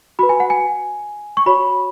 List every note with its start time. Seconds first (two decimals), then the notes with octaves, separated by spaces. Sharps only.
0.19 F#4 B4 B5
0.29 G#5
0.40 F#5
0.50 G#5
1.37 C#6
1.46 F#4 C#5 B5